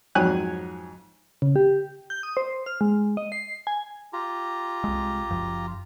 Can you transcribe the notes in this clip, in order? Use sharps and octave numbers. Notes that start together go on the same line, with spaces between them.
F2 G#2 F#3 C#5 G#5 F#6
C#3
G4
G6
D#6
C5
F6
G#3
D#5
C7
G#5
F4 G4 A#5
C2 G#3
F#1 F#2 F3